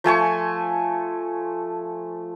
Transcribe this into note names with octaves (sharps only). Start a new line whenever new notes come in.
F3 A3 G#5 C#6